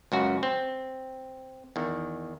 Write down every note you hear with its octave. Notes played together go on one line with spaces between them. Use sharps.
C#2 F#2 F#4
C4
E2 D#3